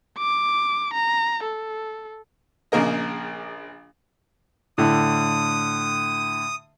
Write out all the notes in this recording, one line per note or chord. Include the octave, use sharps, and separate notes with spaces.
D6
A#5
A4
A#1 C#3 A#3 A#4 D#5
A2 D3 E4 D#6